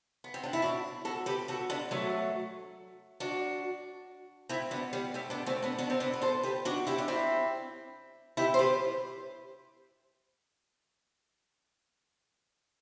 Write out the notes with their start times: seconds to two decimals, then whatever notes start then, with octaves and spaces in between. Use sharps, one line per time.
0.24 B3
0.34 C4
0.44 D4
0.53 E4
0.62 D4 F#4
1.05 F#4 A4
1.26 G4 B4
1.48 F#4 A4
1.70 B3 D4
1.91 F#3 A3
3.20 D4 F#4
4.49 C4 E4
4.71 B3 D4
4.93 G3 B3
5.14 A3 C4
5.30 B3 D4
5.46 A3 C4
5.63 B3 D4
5.79 B3 D4
5.90 C4
6.00 B3 D4
6.14 B4
6.22 A4 C5
6.43 G4 B4
6.65 D4 F#4
6.87 E4 G4
6.98 D4
7.08 C4 E4
8.37 E4 G4
8.54 C5
8.59 G4 B4